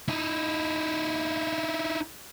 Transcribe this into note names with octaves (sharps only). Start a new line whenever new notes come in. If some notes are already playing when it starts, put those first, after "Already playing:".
D#4 E4